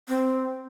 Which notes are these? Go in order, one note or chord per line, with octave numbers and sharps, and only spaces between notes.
C4